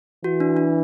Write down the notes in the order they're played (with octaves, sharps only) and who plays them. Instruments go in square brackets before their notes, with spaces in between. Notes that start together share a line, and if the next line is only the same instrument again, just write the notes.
[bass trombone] E3 [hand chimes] F#4
[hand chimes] D4
D4